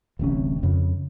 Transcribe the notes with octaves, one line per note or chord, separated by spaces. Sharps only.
D1 A1 C3 C#4
F2 C#3